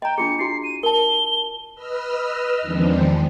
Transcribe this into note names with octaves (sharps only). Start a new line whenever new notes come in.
D#5 G5 A#5
D4 F4 G#4 C#7
E4 F#4 C7
D#7
A#4 A5 G7
B4 D#5 E6 F6
E2 D#3 F3 G#3 C4 D4